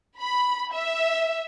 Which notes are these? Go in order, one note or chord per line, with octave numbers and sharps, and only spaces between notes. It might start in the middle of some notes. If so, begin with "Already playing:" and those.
B5
E5